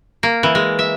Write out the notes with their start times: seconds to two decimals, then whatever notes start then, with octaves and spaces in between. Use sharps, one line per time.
0.23 A#3
0.43 E3
0.55 G#3
0.79 E5